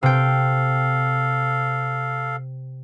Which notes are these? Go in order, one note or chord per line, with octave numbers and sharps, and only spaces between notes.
C3 A4 F5 G5